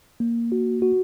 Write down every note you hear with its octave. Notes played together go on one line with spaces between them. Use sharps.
A#3
F#4
F#4